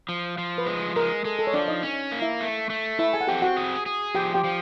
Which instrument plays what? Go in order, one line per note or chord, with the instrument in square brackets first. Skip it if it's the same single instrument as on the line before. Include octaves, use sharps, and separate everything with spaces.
[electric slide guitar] F3
F3
[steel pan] B4
[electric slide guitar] G#3 [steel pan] C5
[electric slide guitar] G#3 [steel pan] A#4
[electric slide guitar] G#3 [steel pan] A4
[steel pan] A4
C#5
[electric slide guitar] F3 [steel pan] D4 D5
[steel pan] D#4 D#5
[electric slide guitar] C#4
A#3
[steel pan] E4 E5
[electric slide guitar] A3
A3
[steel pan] E4 E5 [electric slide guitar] A4
[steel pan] G#4 G#5
F#5
[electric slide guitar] C4 [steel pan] G4 G5
[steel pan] F#4 F#5
[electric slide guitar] G#4
G#4
[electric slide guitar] F3 [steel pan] G4 G5
[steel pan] G4 G5
[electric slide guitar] F3